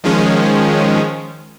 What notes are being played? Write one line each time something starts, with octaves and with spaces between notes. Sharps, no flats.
D#3 F3 G#3 C#4